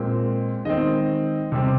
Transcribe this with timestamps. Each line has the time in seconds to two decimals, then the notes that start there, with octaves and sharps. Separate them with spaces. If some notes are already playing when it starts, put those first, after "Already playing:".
Already playing: A#2 G#3 C4
0.65 D#3 G#3 C4 D#5
1.52 C3 G3 C4